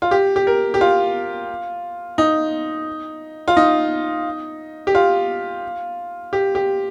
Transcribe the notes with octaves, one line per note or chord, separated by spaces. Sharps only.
F4
G4
G4
A#4
G4
F4
D#4
F4
D#4
G4
F4
G4
G4